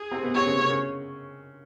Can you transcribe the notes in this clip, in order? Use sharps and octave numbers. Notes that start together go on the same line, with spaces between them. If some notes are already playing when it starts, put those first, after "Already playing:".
Already playing: G#4
C3 C4
B2 B3
C3 C4 C#5
C#3 C#4
C#3 C#4
C#3 C#4